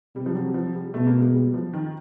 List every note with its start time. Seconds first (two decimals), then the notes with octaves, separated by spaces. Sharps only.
0.16 C3 G3
0.26 F3
0.35 F#3
0.54 F3
0.75 G3
0.94 B2 A3
1.07 A#3
1.21 G#3
1.34 G3
1.54 F3
1.73 D#3